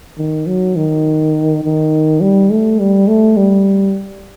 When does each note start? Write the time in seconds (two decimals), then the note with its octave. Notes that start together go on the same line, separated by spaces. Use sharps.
0.18 D#3
0.47 F#3
0.77 D#3
1.64 D#3
2.21 G3
2.50 A3
2.80 G3
3.08 A3
3.37 G3